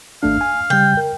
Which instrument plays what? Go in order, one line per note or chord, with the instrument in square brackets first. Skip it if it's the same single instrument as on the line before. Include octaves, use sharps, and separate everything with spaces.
[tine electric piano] G#1 A3 D4 [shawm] F5
[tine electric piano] G#5
[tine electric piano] C#3 G3 [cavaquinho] G5
[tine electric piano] A#4